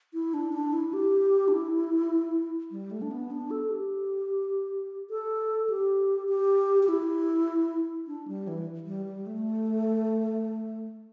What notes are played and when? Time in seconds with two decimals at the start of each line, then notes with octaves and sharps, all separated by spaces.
0.14 E4
0.34 D4
0.53 D4
0.73 E4
0.93 G4
1.48 D4
1.52 E4
2.71 G3
2.91 A3
3.02 D4
3.11 B3
3.31 D4
3.51 A4
3.70 G4
5.10 A4
5.70 G4
6.28 G4
6.83 G4
6.88 E4
8.07 D4
8.28 G3
8.48 E3
8.86 G3
9.06 G3
9.27 A3